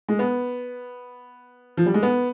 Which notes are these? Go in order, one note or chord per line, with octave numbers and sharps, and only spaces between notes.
G#3
B3
F3
G3
G#3
B3